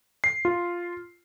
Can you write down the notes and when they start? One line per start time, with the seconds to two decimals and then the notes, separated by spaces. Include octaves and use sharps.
0.24 C7
0.45 F4